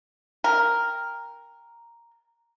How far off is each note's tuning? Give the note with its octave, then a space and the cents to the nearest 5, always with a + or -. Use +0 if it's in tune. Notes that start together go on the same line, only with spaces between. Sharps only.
A#4 +0 G5 +15